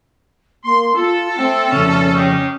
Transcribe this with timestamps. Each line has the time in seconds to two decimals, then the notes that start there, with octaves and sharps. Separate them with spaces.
0.64 A#3 C6
0.95 F4 A4
1.37 A3 C4
1.72 F2 C#3 C#4
2.15 D#4 G4 G#4